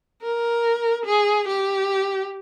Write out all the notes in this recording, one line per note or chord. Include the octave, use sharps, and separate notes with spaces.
A#4
G#4
G4